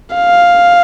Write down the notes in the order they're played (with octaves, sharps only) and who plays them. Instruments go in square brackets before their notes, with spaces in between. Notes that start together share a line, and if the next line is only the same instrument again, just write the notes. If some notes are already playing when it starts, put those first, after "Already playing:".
[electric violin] F5